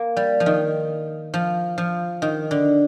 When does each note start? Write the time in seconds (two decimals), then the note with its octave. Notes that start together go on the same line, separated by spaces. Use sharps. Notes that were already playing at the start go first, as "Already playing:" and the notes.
Already playing: A#3
0.16 G3
0.40 F3
0.46 D#3
1.34 F3
1.78 F3
2.22 D#3
2.51 D3